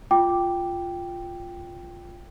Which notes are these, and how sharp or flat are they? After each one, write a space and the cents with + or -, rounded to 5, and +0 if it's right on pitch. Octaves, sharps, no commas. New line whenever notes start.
F4 +0 G5 +0 D6 +0